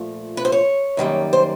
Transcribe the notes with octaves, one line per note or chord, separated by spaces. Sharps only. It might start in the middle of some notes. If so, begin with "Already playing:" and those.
Already playing: A#2 F3 A3 F4
B4
C5
C#5
F#2 D#3 G3 A#3
C5